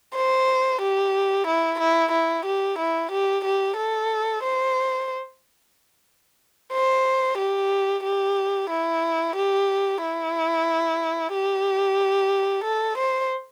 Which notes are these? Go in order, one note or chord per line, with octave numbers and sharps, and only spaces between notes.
C5
G4
E4
E4
E4
G4
E4
G4
G4
A4
C5
C5
G4
G4
E4
G4
E4
G4
A4
C5